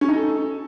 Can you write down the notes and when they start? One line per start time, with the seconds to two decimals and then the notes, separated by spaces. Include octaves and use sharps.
0.01 C#4
0.09 D#4
0.16 A4